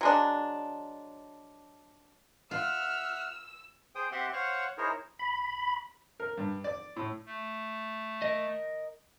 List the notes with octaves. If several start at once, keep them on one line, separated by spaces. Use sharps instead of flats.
F#3 G#3 D4
F4 E5 F#5 E6 F6
G#4 C5 G5 D#6
C4 G4 E5 F#5 C6
C5 C#5 F5 F#5 C#6
D#4 E4 G#4 A#4 C5 C#5
B5
A#4
G2
D5
A2
A3
A#4 D#5